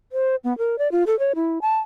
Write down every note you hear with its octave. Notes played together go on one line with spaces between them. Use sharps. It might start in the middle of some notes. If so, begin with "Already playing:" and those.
C5
B3
A#4
D5
F4
A4
C#5
E4
A5